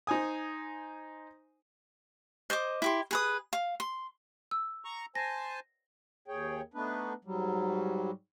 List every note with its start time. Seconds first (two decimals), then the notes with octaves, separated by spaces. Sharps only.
0.07 D#4 C5 G#5 D#6
2.50 C5 D5 D#5 D6
2.82 E4 G4 C6
3.11 G#4 B4 D#6
3.53 F5
3.80 C6
4.51 E6
4.85 A#5 C#6
5.15 C5 G#5 A5 A#6
6.28 D#2 G#4 C#5 G5
6.74 A3 B3 D4 D#4 B4
7.25 G#2 F#3 G3